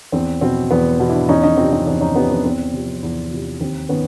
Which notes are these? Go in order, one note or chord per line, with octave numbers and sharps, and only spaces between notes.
E2 C4
B2 C4
E2 B3
B2
D4 E4
E2 C#4 D#4
C#4 D#4
C3 F3 C4 D4
C#4 D#4
E2 C4 D4
C#4 D#4
C3 F3 B3 C#4
C4 D4
E2 C4
C3 F3
E2
C3 F3
D#2 C4
D#3 B3 C#4